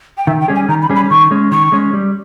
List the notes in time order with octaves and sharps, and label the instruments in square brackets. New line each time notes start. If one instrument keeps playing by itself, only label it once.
[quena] G5
[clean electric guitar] D#3 [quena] E5
[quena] G5
[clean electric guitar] G3 C#4 G#4
[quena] G#5
[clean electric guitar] D#3 [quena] A#5
[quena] B5
[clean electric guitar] G3 C#4 G#4
[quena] B5
[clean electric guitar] D#3 [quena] C#6
[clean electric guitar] G#3 C#4
[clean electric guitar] D#3 [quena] C#6
[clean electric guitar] G#3 C#4
G3